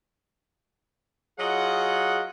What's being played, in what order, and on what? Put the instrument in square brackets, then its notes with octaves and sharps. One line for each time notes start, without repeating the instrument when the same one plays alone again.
[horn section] F#3 F4 G#4 D#5 F#5